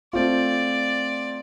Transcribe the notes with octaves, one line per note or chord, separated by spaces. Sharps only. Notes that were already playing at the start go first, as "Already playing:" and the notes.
A3 C4 F4 D5